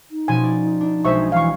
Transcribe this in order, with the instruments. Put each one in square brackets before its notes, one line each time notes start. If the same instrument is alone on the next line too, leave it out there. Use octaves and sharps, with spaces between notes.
[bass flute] D#4
[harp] B2 F3 C#4 [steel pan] G#5
[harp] D5
D4
[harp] B1 G#3 G#6 [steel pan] C5 E5 C#6
[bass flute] E3 [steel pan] F5 C#6